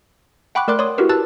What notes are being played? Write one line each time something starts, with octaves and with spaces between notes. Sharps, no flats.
F#5 G5 B5 C#6 D6 F#6
A3 A#4 D5 C6 D6 F#6
C#5 D5 C6 D#6
E4 F#4 G4 A#4 B4
B4 A5 E6 F#6 A6